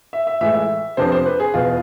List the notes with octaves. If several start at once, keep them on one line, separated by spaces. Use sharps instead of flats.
E5
E5
A2 E3 G#3 E5
E5
F2 C3 F3 B3 D4 C5
C5
B4
G#4
E2 B2 B3 F4